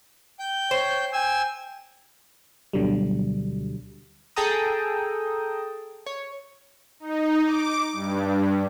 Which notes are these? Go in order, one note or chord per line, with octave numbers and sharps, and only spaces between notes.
G5 G6
C5 C#5
G5 G#5 E6
D2 B2 D3 F#3 G3
G#4 A4 G5 A5 A#5 D#6
C#5
D#4
D6
G2